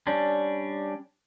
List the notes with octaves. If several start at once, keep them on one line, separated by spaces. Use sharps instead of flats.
G3 C#4 D4